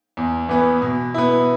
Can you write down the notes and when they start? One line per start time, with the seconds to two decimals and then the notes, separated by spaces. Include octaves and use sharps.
0.17 E2
0.49 E3 B3
0.82 B2
1.14 B3 E4